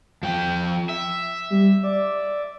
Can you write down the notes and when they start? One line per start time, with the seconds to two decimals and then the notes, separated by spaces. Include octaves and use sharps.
0.23 F3 G5
0.89 E5
1.50 G3
1.83 D5